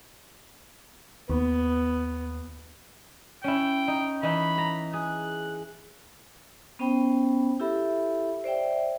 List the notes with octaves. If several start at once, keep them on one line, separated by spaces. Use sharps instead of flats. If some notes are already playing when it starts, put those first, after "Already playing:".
D#2 B3
C#4 E4 G5
D#4
E3 D#4 B5
A#5
G#4 F#6
B3 C#4 C5 G5 B5
E4 G4 A4 E5 B5
C5 D5 E5 G5